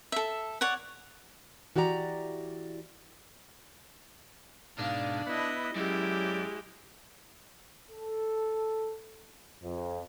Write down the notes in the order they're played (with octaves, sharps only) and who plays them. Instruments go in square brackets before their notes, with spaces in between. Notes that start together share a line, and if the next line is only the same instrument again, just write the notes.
[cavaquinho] A4 E5
C#5 D5 F#5
[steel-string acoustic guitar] E3 F#4 G4 D5 E5 A#5
[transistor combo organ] G#2 B2 D#4 [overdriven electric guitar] D4 [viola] F5
[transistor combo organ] B3 B4 [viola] E4 D#5
[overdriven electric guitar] F#2 [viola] G#3 [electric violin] E4 G4 [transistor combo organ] D5
[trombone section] A4
F2